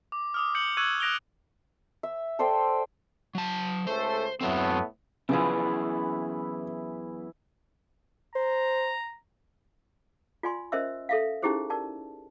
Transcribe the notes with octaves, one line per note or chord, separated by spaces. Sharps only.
D6
D6 D#6 F6
G6 C#7 F#7
C#6 E6 F#6 G#6 D#7 F#7
D#6 F#6 A#6 D7 F7 G7
E5
A4 C5 D5 G5
F#3 A5
C#2 A3 A4 C5
F#2 A2 F#3 A3 B3 C4
F#2 C#3 E3 F3 B3 E4 G#4
C5 A#5
F4 D5 G#5 C6
C#4 A#4 C5 D#5 E5 E6
A4 E5 F5
C#4 D#4 E4 G4 G#4 C5
A#4 D5 A5